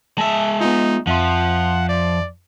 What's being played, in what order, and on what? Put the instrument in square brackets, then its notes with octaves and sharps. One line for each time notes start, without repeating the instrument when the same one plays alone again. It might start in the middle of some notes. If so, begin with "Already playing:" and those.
[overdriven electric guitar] G#3 E5 [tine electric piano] A5
[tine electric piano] B3 F4 [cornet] D#4
[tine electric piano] F2 E5 C6 [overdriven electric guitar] F3 [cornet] F#5
[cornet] D5